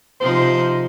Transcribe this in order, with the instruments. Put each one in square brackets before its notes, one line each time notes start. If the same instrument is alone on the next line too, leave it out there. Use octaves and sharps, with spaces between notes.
[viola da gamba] C3 F3 D#4 [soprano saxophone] C5